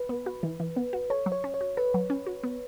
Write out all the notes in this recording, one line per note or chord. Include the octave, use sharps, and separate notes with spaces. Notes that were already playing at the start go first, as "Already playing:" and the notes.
Already playing: B4
B3
F#4
E3
E3
B3
F#4
A4 C#5
F#3
C#5
C#4
C#5
F#4
A4 B4
F#3
C#4
F#4
B3